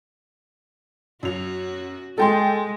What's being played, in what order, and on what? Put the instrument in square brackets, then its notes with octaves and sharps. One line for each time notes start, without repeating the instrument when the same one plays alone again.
[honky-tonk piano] F#2 F7 [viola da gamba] F#4
[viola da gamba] G#3 [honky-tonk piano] A4 G5 C6